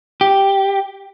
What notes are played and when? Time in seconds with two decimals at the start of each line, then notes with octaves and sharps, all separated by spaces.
0.21 G4